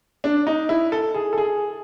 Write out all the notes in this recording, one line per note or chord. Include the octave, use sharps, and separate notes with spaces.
D4
D#4
E4
A4
G#4
A4
G#4